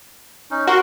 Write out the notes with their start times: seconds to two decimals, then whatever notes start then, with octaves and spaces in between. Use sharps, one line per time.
0.51 C#4 D#4
0.68 F#4 A#4 C6